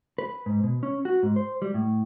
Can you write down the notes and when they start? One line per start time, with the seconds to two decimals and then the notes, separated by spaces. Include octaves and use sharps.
0.18 B4
0.46 G#2
0.63 B2
0.83 C#4
1.05 F#4
1.23 G#2
1.36 C5
1.62 G3
1.74 A2